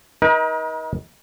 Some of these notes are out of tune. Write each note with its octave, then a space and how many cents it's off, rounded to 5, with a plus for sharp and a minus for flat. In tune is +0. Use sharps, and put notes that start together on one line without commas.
D#4 +25 A#4 +45